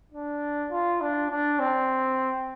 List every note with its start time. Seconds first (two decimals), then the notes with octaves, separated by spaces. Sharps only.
0.12 D4
0.71 F4
1.01 D4
1.30 D4
1.59 C4